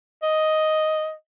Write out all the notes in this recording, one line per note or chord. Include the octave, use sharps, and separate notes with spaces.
D#5